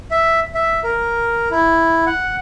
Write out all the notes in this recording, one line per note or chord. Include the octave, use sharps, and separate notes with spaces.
E5
E5
A#4
E4
F#5